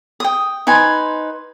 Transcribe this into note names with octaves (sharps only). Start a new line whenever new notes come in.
G5 D#6
D#4 B4 C5 G#5